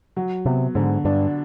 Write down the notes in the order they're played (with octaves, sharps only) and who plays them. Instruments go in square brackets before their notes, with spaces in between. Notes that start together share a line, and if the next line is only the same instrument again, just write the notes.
[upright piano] F#3
[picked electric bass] C3 [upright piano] B3
[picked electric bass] G#2 [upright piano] D3
[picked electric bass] G2 [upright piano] D4